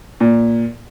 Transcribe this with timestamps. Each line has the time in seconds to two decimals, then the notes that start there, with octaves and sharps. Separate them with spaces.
0.20 A#2